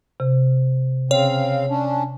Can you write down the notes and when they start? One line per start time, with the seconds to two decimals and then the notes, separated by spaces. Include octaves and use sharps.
0.20 C3
1.11 C#3 C4 C#5 F5
1.69 C#4 D4